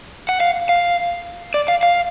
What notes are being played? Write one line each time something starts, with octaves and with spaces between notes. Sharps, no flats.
F#5
F5
F5
D5
F5
F5